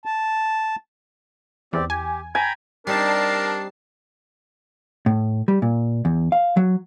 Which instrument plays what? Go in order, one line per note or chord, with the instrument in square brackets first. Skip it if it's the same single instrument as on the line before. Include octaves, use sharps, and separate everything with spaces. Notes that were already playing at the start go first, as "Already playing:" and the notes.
[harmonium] A5
[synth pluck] E2 [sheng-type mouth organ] C4 G4 D5
[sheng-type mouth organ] G4 [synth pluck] G#5
[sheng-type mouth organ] G5 A#5 B5 [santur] G#5
[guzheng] G3 C4 D#4 [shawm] D4 [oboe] A#4 [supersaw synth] A5 C7
[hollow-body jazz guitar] A2
G3
A#2
E2
F5
F#3